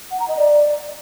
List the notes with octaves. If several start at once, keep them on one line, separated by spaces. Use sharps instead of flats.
F#5
A#5
D#5
D5